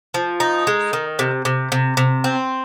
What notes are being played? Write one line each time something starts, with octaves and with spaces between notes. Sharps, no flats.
F3
D#4
G#3
D#3
C3
C3
C3
C3
C4